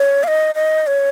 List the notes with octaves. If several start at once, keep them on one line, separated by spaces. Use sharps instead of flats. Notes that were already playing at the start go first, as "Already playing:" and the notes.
Already playing: C#5
F5
D#5
D#5
C#5